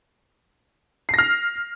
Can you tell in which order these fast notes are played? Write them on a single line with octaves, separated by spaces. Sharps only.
C7 A#6 F6